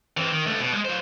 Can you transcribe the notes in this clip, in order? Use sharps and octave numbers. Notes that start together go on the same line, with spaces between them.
E3 C4
D#3
C#2 A3
B2
G3 G#3
F#3 C5